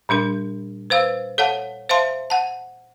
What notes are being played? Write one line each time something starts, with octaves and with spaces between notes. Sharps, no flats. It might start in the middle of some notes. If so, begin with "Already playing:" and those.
A#2 G3 D4 A#4
B4 C5 F5 E6
A4 C#5 F5 F#5 A5
C5 E5 F5 A5 C6
F#5 A5